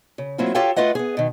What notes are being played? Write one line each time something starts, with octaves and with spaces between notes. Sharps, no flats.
C#3
F#3 A3 A#3 C4 E4 F4
F4 G4 A4 C#5 F5 G5
A3 F4 B4 D#5 F#5
B3 G#4
B2 D#3